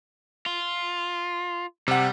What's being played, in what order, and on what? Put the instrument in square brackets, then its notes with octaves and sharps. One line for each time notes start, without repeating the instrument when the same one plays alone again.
[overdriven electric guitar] F4
[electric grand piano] C3 F#5 [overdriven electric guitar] G3